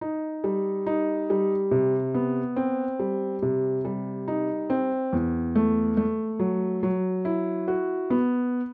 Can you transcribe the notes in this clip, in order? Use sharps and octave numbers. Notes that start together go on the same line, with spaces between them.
D#4
G3
D#4
G3
C3
B3
C4
G3
C3
G3
D#4
C4
E2
A3
A3
F#3
F#3
E4
F#4
B3